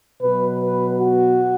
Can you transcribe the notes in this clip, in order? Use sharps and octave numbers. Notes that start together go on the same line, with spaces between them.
B2 F#3 B3 B4
B4
F#4